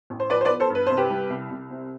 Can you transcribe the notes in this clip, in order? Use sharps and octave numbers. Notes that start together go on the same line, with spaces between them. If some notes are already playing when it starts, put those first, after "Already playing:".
A1
C5
F3 B4 D5
C5
B4 D5
B3
A4 C5
G2
B4
C2 C5
G4 B4
G3
C2
C2
C3